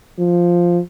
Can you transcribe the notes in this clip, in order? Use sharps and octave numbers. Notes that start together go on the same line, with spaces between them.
F3